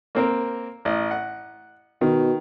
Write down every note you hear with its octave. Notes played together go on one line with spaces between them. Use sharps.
A#3 C4 A#4
A1
F#5
B2 D#3